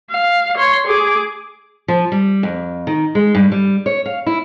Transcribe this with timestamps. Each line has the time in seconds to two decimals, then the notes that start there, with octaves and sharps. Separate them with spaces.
0.11 F5
0.57 C#5 C6
0.86 G#4 D6
1.88 F3
2.12 G3
2.43 F2
2.87 D#3
3.15 G#3
3.35 G2
3.52 G3
3.86 C#5
4.06 F5
4.26 E4